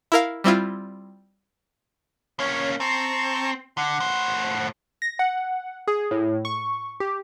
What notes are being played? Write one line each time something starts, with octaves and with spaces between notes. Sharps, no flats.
E4 A#4 F5
G3 C4 E4 F4
A#3 C#4 C#5
C4 A5 A#5 C#6
D3 F#5
A2 C5
A#6
F#5
G#4
A2
C#6
G4